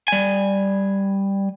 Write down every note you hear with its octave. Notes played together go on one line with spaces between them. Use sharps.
G3 G#5